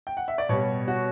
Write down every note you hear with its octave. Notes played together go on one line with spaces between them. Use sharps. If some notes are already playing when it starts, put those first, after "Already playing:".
G5
F#5
E5
D5
B2 G3 C#5
F#4